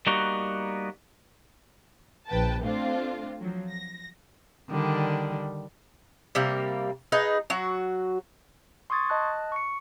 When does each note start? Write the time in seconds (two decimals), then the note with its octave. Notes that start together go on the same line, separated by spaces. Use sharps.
0.07 G3 A#3 B3 D#4 F#4
2.27 A#1 B4 G5 A5
2.63 A3 C4 D4 F4
3.40 F3 F#3
3.69 A#6
4.70 D3 D#3 G3
6.35 C3 G3 A#3
7.12 D#4 G#4 B4
7.50 F#3 F#4
8.90 C6 C#6 D#6 G#6 A6
9.10 D#5 A5 F#6
9.52 C#6 C#7